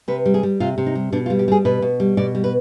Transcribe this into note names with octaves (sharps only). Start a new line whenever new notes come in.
C3 B4
G3
G#4
G3
C3 F4
C3
D#4
G3
B2 D4
F4
G3
G4
G3 G#4
B2 B4
B2
G3
B2 D5
G3
B4